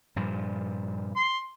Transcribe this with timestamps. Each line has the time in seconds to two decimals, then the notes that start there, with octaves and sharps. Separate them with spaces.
0.16 G2 A#2 F3
1.16 C6